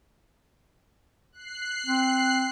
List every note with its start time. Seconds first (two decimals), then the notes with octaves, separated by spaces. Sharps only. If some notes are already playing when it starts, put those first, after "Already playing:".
1.32 F#6 C7
1.86 C4